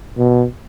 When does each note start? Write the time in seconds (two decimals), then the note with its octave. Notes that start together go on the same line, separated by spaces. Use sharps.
0.17 B2